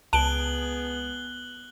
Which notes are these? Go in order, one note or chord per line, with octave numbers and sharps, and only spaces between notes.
C#2 B3 G#4 A5 F#6 D7 F#7 G7